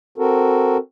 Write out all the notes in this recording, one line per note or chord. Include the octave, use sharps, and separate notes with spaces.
C4 F#4 A4 A#4